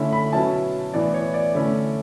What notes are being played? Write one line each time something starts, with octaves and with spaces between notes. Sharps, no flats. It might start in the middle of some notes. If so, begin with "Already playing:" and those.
Already playing: D3 A3 C#4 E4
B5
B2 F#3 C#4 E4 A5
A2 E3 B3 D5
C#5
D5
D3 A3 C#4 E4